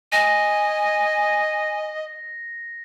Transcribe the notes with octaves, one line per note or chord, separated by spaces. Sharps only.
D#5 G#5 A#6